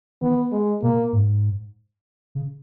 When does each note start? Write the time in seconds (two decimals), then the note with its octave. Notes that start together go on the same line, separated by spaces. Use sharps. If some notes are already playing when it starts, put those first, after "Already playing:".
0.22 D#3 B3
0.52 G#3
0.82 B2 A#3
1.13 G#2
2.35 C#3